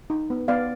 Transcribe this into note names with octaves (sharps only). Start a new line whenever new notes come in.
D#4
B3
B3 D5 F5